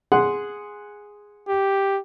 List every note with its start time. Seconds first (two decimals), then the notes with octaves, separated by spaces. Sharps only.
0.12 G#4 F#5 C6
1.48 G4